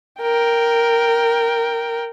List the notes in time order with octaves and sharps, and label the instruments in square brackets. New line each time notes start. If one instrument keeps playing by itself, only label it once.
[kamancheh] A#4 G5